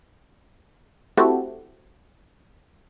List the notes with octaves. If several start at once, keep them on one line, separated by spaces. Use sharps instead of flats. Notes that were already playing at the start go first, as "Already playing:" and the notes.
A3 C4 E4 F#4 G4 A4